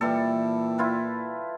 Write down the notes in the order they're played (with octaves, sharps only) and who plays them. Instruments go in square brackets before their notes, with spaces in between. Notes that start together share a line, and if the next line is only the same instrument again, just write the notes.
[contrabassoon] A#2 [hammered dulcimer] E3 G3 A4
[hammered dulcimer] E4 F4 B4